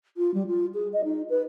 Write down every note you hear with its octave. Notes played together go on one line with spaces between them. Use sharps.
F4
G3
F4
G#4
D#5
D#4
B4